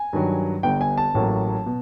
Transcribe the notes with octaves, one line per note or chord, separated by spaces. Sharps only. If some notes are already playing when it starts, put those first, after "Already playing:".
Already playing: G#5
G2 D#3 F#3
G1 G2 D3 G5
G#5
A5
A1 A2 F#3 A#3
B2